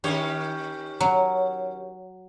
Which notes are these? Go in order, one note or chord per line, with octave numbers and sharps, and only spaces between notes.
D#3 C#4 G4 C#5
F#3